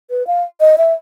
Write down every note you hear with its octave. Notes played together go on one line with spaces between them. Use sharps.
B4
F5
D#5
E5